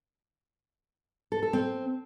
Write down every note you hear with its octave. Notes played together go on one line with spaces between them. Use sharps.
A4
A4
C4